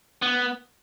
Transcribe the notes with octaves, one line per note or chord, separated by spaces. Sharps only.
B3